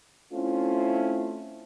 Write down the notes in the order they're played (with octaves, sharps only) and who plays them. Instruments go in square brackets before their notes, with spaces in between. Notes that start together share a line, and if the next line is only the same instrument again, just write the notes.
[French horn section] A3 C4 C#4 E4 F4